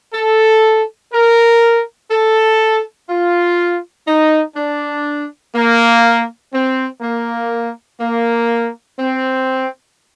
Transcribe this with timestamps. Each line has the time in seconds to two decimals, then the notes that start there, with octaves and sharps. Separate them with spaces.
0.14 A4
1.13 A#4
2.11 A4
3.09 F4
4.08 D#4
4.57 D4
5.55 A#3
6.53 C4
7.01 A#3
8.00 A#3
8.98 C4